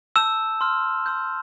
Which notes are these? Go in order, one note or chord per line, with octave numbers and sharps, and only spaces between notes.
A5 E6 G6 E7
C6 F6
C6 E6 G6